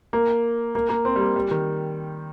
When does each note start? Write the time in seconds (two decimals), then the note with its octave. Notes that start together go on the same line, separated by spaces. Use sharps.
0.13 A#3
0.75 A#3
0.89 A#3
1.05 C4
1.16 G3
1.20 A#3
1.36 G3
1.51 D#3